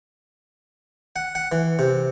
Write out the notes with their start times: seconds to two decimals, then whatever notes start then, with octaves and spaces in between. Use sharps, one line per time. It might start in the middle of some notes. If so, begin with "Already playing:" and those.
1.16 F#5
1.35 F#5
1.52 E3
1.79 C3